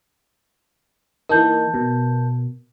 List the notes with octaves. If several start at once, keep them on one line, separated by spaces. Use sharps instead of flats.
E3 A#3 D#4 A#4 A5 G6
B2